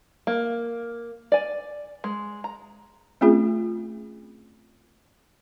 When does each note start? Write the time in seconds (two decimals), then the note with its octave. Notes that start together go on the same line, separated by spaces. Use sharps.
0.27 A#3
1.32 D5 G#5
2.04 G#3
2.44 A#5
3.21 A3 C4 C#4 F4 G#4